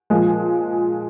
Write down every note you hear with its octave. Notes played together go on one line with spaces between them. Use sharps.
A#2 F3 G#3